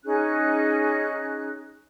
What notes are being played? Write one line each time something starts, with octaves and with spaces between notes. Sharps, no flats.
C#4 D#4 G#4 F#6